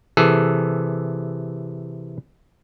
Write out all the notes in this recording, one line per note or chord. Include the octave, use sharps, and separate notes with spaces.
C3 E3 G#4 A4